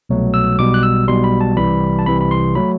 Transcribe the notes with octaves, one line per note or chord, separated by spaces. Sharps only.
C2 B2 F#3 A3
E6
B1 B2 G3 D6
F#6
E6
B1 B2 G3 C6
B5
A5
C2 C3 E3 G3 B5
A5
C2 C3 E3 G3 B5
B5
C6
F#3 A3 B5